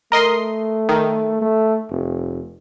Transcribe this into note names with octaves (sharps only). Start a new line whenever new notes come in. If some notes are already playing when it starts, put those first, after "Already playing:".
A3 A#4 D#5 C6
D#3
A3
F1